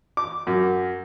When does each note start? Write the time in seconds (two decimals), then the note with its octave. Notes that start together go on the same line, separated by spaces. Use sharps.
0.17 D6
0.47 F#2